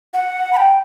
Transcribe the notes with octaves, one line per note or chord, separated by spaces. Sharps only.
F#5
B5
G5